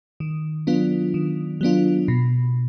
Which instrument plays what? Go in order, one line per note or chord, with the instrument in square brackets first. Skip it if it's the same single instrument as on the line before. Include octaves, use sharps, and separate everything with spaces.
[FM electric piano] D#3
F#3 B3 D4 F4
D#3
F#3 B3 D4 F4
B2